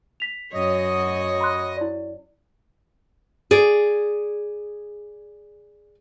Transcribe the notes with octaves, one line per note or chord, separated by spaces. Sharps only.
B6 F7
F#2 F#3 C#5 D#5
B5 C6 F#6
E4 D5
G#4 D5